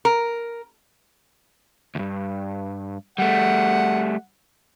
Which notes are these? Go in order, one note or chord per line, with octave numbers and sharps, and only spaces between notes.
A#4
D2 G2
G3 A3 F#5